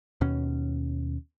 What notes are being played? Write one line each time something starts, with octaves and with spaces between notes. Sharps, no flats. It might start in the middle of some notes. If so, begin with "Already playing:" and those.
D#2 B2 C#4